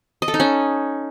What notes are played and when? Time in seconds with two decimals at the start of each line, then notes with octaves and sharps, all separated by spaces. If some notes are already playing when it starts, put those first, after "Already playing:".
0.22 D#5
0.28 A4
0.34 D#4
0.40 C#4